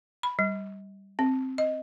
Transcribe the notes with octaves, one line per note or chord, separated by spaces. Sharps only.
B5
G3
C4
D#5